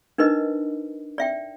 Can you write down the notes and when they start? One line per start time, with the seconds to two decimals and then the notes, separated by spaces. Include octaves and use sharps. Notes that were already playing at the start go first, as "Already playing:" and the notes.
0.18 D4 D#4 A#4 B4 D#5
1.18 D5 E5 G5